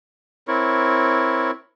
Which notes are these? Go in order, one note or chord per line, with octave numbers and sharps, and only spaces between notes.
C4 E4 A#4 C#5